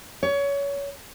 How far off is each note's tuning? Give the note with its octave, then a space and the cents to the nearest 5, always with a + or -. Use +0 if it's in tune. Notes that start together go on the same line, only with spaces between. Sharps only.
C#5 +25